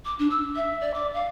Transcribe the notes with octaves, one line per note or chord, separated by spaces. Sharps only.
D6
D4
E6
E5
D5
D6
F5